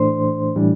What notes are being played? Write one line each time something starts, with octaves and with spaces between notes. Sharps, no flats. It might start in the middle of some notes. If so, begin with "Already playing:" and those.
Already playing: A2 E3 A3 D4 C5 C6
A2 E3 G3 D4